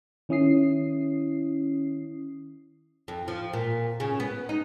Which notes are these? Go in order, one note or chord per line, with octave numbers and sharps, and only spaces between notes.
D#3 C#4 E4 D#6 C7
F2
F3
A#2
C#3
B3
D#4